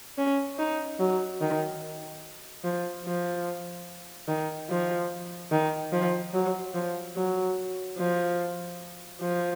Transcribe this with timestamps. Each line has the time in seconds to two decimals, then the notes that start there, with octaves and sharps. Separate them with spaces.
0.18 C#4
0.58 D#4
0.99 F#3
1.41 D#3
2.64 F3
3.05 F3
4.28 D#3
4.70 F3
5.52 D#3
5.92 F3
6.34 F#3
6.75 F3
7.16 F#3
7.98 F3
9.21 F3